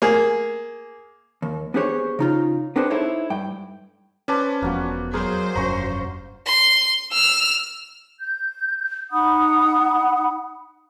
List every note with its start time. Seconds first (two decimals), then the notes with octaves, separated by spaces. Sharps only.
0.02 A#3 G#4
1.42 D#2
1.74 B3 D4 G4 G#4 C5 C#5
2.19 C#3 D#4 F4
2.76 B3 C4 D4 G#4 B4 C5
2.90 D#4 E4 A4 C5 C#5
3.30 G2 G5
4.28 C#4 B4 C5 D5 A5
4.62 E1 F3 A#3 B3 F#4
5.14 F#3 G#4 A#4 C5
5.56 F1 G2 C#4 A#5 C#6
6.46 C6
7.12 E6 F6
8.20 G6
9.11 D#4 F#5 B5 D#6